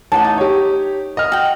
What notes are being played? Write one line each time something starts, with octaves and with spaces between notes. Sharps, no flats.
A1 D#4 F#5 A5
D#4
G4 C#5
D#5 F6
F#4 G5